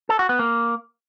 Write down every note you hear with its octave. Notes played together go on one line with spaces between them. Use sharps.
A4
F#4
B3
A#3